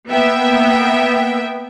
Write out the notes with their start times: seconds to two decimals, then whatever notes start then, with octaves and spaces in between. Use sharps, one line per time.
0.10 A#3 B3 E5 G5